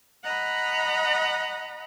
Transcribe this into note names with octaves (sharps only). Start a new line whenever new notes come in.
D#5 F#5 A#5 B5